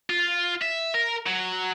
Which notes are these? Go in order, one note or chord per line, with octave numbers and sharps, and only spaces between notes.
F4
E5
A#4
F#3